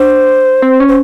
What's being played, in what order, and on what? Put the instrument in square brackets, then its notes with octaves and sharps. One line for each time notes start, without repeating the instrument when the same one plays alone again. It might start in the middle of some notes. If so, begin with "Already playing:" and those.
Already playing: [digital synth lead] D4 [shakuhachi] C5
[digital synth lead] C4
C#4
[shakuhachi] C5